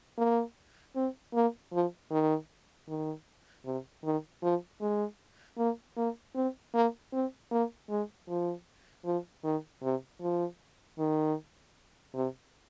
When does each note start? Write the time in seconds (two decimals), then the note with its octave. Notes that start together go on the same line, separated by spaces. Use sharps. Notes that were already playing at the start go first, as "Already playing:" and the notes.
0.18 A#3
0.95 C4
1.34 A#3
1.72 F3
2.11 D#3
2.88 D#3
3.65 C3
4.04 D#3
4.43 F3
4.81 G#3
5.58 A#3
5.97 A#3
6.35 C4
6.74 A#3
7.13 C4
7.51 A#3
7.89 G#3
8.28 F3
9.05 F3
9.44 D#3
9.82 C3
10.21 F3
10.98 D#3
12.14 C3